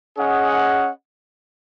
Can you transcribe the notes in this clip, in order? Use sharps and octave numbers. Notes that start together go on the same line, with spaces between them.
C#4 G#4 D#5 F#5